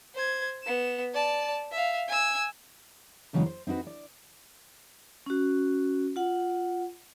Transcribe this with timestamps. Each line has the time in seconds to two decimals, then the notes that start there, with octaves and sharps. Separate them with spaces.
0.14 C5 G#6
0.63 B3 E7
1.14 D5 A5
1.72 E5 F5
2.08 G#5 E6
3.33 G2 C#3 E3 F#3 G#3 B3
3.46 C5
3.67 C4 D#4 E4 F#4 B4
3.87 D5
5.26 C#4 F#4
6.16 F4 F#5